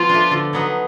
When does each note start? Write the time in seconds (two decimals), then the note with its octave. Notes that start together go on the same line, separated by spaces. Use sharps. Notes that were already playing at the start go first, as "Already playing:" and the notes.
Already playing: F3 B3 F4
0.09 A3 D4
0.31 D3
0.53 F#3 B3 D#4 F#4